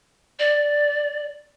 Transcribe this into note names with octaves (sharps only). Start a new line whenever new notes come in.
D5